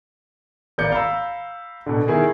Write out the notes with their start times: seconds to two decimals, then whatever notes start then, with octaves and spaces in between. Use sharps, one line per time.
0.78 G#1 A#3 D5 G6 C#7
0.92 F5 A#5 B5 E6
1.86 B2 D3
2.08 D#3 E4 G#4 A#4